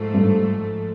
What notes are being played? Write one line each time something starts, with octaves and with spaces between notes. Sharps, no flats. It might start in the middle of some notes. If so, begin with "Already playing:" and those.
Already playing: G#2 F3 A3
G2